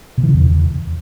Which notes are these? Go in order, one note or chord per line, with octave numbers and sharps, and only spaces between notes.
B2
E3
C#3
E2